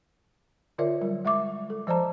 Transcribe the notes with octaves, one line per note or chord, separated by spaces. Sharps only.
D3 F4 A#4 C#5 D5 E5
F#3 G3
G#3 E5 C#6 D6
A4
F3 C5 D5 A5 A#5